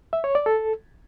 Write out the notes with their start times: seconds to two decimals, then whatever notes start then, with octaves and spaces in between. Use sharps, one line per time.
0.13 E5
0.24 C#5
0.35 D5
0.46 A4